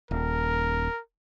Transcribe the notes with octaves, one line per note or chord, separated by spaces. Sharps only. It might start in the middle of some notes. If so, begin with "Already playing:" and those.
D#1 A#4